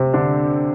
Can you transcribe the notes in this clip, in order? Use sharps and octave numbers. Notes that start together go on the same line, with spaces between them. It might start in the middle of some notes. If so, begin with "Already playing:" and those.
Already playing: C3 C4
D3 D4